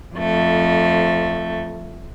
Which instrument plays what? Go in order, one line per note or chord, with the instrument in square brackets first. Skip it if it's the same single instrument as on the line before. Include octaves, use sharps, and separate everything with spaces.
[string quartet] F2 A3